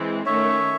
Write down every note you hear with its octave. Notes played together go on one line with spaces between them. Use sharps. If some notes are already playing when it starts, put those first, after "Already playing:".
Already playing: E3 G#3 C4
D#3 A3 C#4 C#5 E5